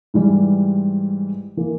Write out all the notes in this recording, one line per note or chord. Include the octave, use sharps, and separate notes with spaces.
G#2 E3 G3
E3 A#3